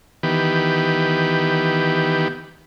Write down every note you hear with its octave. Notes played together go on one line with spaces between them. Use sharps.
D#3 E3 B3 G4